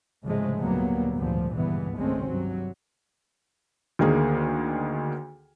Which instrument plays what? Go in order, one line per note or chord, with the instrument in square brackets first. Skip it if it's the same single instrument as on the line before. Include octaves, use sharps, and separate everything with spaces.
[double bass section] C2 G#2 C#3 F3 G#3 A3
D2 A#2 F#3 G3 A#3 B3
G#1 D2 G2 A#2 F3
C#2 G2 E3 B3
G#1 G#3 A3 C4 C#4
G2 C3 F#3
[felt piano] D2 D#3 A#3 G#4